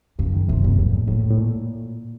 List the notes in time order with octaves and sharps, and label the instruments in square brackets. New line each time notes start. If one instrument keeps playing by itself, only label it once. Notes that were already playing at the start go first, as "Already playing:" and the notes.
[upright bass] F#2 [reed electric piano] C#3
[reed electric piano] D#3
[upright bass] F#2 [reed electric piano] C3
[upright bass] F#2 [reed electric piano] A#2
[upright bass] F2 [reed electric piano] A2
[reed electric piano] A#2
[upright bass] F2 [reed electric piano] A2
[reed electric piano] A2
A#2